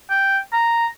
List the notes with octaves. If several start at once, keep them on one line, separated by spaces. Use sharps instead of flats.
G5
A#5